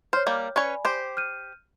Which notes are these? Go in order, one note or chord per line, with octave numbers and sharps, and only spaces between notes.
C5 C#5 F6
G3 A#3
C#4 B4 C#5 D5 G#5 B5
G4 C5
F6 G6 D#7